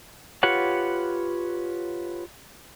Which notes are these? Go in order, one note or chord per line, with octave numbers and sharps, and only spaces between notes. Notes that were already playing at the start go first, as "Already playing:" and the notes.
F4 G4 B4 C#5 F#5